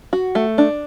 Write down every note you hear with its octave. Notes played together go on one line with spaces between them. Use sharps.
F#4
A3
D4